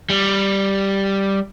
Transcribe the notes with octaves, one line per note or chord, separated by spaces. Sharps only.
G3